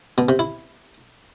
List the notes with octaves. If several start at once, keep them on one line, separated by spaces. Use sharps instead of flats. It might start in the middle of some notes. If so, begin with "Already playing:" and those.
B2
C3
E4